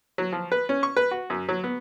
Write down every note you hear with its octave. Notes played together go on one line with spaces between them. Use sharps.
F#3
F3
B4
C#4
C#6
B4
F#4
F#2
F#3
B3